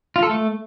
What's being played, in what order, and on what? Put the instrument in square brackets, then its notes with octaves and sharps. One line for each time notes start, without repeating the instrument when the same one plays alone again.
[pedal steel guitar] F4
A4
A3